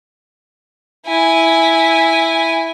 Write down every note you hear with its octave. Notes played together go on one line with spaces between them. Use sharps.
E4 G#5